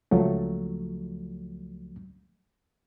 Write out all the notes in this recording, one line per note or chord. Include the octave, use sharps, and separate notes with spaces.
C#2 F3 F#3 A3